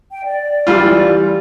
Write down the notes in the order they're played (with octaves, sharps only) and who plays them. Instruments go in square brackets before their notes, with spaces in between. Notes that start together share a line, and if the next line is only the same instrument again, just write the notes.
[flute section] G5
D5
[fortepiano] E3 G3 F4